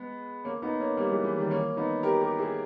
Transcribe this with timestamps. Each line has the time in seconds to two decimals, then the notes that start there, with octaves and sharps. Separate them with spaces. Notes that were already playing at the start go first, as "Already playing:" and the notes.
Already playing: G#3 B3
0.44 A#3 C#4
0.62 B3 D#4
0.80 A#3 C#4
0.97 G3 A#3
1.11 E3 G#3
1.24 E3
1.37 D#3 G3
1.51 A#3 C#4
1.77 B3 D#4
2.03 G4 A#4
2.21 G4 A#4
2.38 E4 G#4